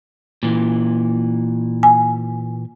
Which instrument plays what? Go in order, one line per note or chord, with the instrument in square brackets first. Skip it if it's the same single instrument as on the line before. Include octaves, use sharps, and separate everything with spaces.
[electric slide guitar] A#2 E3
[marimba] G#5